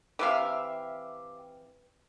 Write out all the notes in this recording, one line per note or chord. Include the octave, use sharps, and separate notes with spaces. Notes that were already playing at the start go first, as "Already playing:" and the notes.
C3 E3 G4 E5 F5